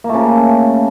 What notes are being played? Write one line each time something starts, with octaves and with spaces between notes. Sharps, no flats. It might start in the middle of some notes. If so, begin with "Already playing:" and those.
C#3 A3 A#3